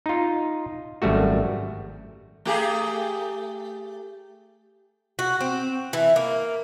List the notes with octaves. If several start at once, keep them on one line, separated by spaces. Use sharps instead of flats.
D#4 F4
G#1 F#2 G3 A3 F#4
A3 G4 G#4
F#4
C4
E3
A#3